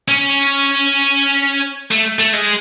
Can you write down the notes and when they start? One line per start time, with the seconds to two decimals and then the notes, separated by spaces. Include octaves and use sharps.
0.08 C#4
1.91 A3
2.19 A3
2.33 G#3